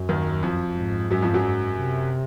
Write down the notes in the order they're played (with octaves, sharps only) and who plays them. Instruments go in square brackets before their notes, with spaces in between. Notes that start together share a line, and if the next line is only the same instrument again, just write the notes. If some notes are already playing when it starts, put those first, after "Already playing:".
Already playing: [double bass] F#2
[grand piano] D#2 D#3
F2 F3
[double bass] G#2
[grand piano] F#2 F#3
F2 F3
F#2 F#3
[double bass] C3